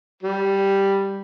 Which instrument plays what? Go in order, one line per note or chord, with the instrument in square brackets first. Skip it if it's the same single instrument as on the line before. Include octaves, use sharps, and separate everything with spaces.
[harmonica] G3